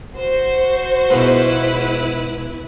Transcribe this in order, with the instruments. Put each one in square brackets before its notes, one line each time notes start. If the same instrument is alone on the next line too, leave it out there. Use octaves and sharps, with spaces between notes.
[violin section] F#4 C5
[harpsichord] G#2 B2 F3 [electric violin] E4 B4